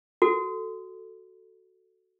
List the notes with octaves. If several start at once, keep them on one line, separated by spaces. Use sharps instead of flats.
F#4 A4